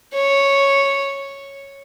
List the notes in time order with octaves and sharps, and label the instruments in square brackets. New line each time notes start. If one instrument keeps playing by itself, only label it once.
[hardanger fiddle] C#5